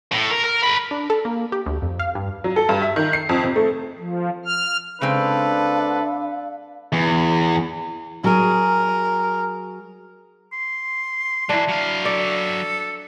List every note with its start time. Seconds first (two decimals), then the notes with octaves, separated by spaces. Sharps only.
0.12 A2
0.30 A#4
0.44 A#4
0.64 A#4 B5
0.91 D4
1.10 A4
1.25 A#3
1.52 G4
1.66 D2
1.82 F2
1.99 F5
2.15 G2
2.44 F#3
2.56 A4
2.69 G2
2.82 E5
2.96 D#3
3.13 C7
3.29 F2
3.44 C3
3.56 A3
3.99 F3
4.45 F6
5.01 C#3 G#3 C4 D4 A4 B4 F5
6.92 E2
8.24 F#3 G#4 A#4
10.53 C6
11.49 E3 F#3 D4 E4
11.69 F#3 F5
12.05 A4 D5